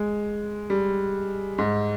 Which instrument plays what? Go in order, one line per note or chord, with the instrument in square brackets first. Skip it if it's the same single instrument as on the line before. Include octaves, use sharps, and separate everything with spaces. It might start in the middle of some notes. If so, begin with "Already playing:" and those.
Already playing: [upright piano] G#3
G3
G#2